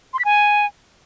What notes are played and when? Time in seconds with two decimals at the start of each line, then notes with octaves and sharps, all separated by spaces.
0.13 C6
0.19 B6
0.25 G#5